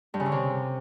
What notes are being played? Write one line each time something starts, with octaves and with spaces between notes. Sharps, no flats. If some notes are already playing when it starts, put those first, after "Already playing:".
G2
C#3
D3
C3